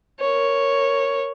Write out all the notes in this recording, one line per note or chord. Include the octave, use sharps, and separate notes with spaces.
A#4 C#5